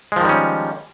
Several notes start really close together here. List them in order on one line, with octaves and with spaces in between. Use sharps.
G#3 F3 D#3 G3 C#4